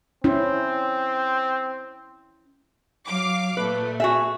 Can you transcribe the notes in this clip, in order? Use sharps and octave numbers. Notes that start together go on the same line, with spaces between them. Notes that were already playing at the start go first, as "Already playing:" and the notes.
C4 C#4 E4
F#3 F5 D6
A#2 A3 B4
F#4 G#4 E5